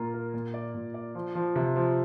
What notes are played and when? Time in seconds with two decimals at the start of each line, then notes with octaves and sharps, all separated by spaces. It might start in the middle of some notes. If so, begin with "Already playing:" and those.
Already playing: A#2 A#3 F4
0.14 A#4
0.34 A#2
0.54 D5
0.74 A#2
0.94 D5
1.15 F3
1.35 F3
1.56 C3
1.76 F3